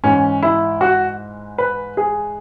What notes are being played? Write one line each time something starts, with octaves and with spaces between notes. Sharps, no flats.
G#2 E3 C#4
E4
F#4
B4
G#4